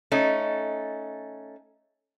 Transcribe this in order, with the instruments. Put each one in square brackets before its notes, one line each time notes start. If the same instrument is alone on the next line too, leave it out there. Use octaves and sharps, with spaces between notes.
[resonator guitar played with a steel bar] A3 C#4 D#4